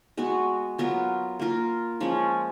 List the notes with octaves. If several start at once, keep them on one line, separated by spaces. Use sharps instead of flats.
G#3 B3 F#4
F#3 B3 F4 A#4
A#3 F4 A#4
F3 G#3 C#4